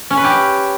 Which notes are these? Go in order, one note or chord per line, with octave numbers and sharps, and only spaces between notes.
C#4
B4
G4